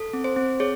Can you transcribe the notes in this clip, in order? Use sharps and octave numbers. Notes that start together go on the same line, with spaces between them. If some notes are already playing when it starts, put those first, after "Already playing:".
Already playing: A4
C4
C5
C4
G#4 C#5